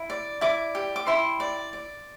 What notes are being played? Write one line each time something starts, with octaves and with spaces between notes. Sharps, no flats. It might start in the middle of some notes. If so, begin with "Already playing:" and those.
Already playing: E4
D5
E4 D5 D6
G4
D6
E4 C5 C6
D5
D5